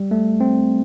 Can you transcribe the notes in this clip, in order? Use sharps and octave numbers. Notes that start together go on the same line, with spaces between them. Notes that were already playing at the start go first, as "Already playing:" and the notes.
Already playing: G3
A3
C4